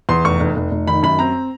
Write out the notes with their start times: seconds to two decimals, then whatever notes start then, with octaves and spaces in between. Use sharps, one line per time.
0.09 E2 C6
0.24 F1 C#6
0.40 F1
0.56 F1
0.71 F1
0.87 D#3 B5
1.03 F#2 B5
1.19 C4 A#5